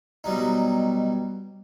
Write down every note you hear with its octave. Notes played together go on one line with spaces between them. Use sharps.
B2 F#3 G3 D#4